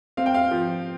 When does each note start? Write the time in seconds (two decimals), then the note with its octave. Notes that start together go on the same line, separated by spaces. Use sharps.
0.17 C4 F5
0.26 G5
0.34 F5
0.51 F3